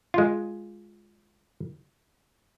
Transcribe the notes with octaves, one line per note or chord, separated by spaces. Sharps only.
G#3 F4